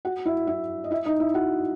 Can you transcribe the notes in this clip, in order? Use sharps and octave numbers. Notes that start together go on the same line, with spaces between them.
F#4 F#5
E4 E5
E4 E5
D#5
E4 E5
D#4 D#5
E4 E5
F#4 F#5